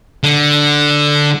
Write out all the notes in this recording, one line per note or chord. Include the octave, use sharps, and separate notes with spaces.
D3